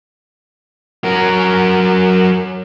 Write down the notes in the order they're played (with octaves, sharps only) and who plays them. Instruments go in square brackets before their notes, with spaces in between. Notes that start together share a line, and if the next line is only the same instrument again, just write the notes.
[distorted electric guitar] F#3 A#4